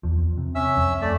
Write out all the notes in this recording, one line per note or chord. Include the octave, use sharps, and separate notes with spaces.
E2 F3
C3
C#4 E5 E6
F2
A3 D5